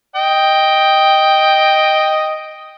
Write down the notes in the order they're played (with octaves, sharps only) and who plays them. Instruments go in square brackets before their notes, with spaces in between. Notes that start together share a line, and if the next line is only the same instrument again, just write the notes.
[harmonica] D#5 G5